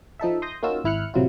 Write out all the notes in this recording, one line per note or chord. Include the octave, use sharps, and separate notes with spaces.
F3 D#4 A4 E5
C6 D#6 G6 A#6
A#3 C#4 D#4 F4 F#4 E6
G#1 E4 F6 F#6 C#7
A1 C3 F#3 E4 F4